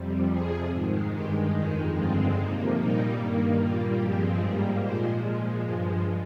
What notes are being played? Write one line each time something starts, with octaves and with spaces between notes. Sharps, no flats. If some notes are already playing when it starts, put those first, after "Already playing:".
Already playing: F2 C3 G3
F2 C3 F3 G#4
G#2 D#3 G#3
G2 D#3 G#3 G4
F2 D#3 G#3 D#4
G2 D3 G#3 C4 F4
C3 F3 A#3 D#4
A#2 G3 A#3 D#4
G2 D#3 A#3
A#2 G3 A#3 F4
G2 F3 G#3 C4 G4
G#2 G3 A#3 G#4
A#2 F3 G#3 C5
A#2 F3 G#3
G2 F3 G#3